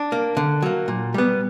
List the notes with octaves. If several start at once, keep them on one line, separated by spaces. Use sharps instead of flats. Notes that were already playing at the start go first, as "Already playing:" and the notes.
Already playing: D4
A#3
D3
F#3 A#3
A#2
G3 B3